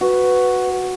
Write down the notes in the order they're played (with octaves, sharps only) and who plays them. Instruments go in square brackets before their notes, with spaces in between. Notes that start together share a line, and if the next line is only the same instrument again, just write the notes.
[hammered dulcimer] F#4 [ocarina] B4